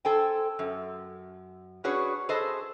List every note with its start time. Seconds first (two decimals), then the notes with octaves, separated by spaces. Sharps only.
0.05 A4 C5 G5 G#5
0.59 F#2
1.84 C#4 D4 F#4 G#4 B4 C#5
2.29 G#4 A4 B4 C5 D#5